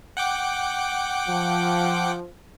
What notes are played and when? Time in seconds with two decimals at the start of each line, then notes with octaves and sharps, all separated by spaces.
0.17 F#5 G5 D6
1.28 F3